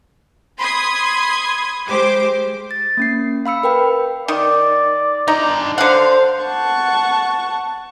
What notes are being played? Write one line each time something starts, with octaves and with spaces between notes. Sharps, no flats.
B5 C6 D#6 G#6 C7
G#3 G4 C5 D6
A6
A#3 C#4 C7
F5 B5 E6 C#7
A#4 B4 G5 B5
D#3 D5
D3 D#4 A#5
D3 C5 F5 F#5
F#5 A5 C#6